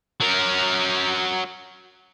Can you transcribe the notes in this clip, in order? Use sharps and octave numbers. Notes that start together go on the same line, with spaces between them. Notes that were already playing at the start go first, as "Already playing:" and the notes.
F#3 A#4